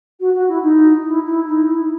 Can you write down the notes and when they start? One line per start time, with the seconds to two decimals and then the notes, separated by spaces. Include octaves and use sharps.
0.20 F#4
0.33 F#4
0.48 E4
0.62 D#4
1.05 E4
1.26 E4
1.47 D#4
1.68 E4